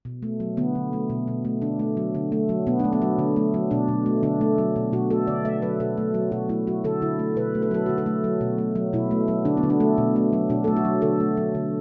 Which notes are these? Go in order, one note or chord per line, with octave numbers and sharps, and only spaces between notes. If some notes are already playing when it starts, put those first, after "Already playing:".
B2
A3
F#3
D3 B3
D3
A3
B2
B2
A3
D3 D4
A3
F#3
D3
A3
F#3
B2 B3
A3 D4
B3
F#3
D3
A3
F#3
B2 D4
B2
A3
D3 D4
A3
F#3
B2
B2 F#4
A3 A4
D3 D5
A3 E5
F#3 B4
B2 A4
A3
F#3
B2 F#4
A3 E4
F#3 F#4
D3 A4
D3 E4
A3
B2 B4
A3
B4
F#3 A4
D3 F#4
A4
A3
F#3
B2
A3
F#3
B2 E4
A3
F#3
D3 D4
B3
D3
D4
A3
B2
A3
F#3
B2 D4
A3 A4
F#4
F#3
D3 A4
A3
F#3
D3